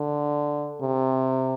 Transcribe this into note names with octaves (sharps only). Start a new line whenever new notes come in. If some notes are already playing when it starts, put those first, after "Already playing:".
Already playing: D3
C3